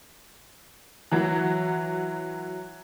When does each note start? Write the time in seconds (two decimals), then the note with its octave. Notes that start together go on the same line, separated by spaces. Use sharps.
1.12 E3 F#3